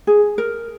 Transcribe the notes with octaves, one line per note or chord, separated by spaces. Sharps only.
G#4
A#4